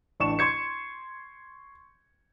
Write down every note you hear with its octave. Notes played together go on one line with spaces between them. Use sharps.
A1 D4 C#6 E7
C6 C#6 G#6 C#7